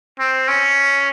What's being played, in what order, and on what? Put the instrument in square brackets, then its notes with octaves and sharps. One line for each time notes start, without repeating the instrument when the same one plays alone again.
[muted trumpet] C4
C#4